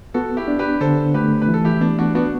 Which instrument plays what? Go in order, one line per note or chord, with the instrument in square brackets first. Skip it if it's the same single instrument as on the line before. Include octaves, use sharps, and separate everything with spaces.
[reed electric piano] B3 [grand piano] F#4 A4
[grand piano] E4 G4
[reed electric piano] D4
[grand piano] G4 B4
[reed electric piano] D3 [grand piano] A4 C5
[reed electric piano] A3 [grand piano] G4 B4
[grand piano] B4
[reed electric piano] E3
[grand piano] A4
E4 G4
[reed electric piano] B3 [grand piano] D4
[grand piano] D4 F#4
[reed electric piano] B3 [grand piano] D4 F#4